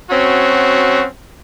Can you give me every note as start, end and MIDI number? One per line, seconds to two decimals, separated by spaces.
0.10 1.04 54
0.10 1.04 60
0.10 1.04 61
0.10 1.04 66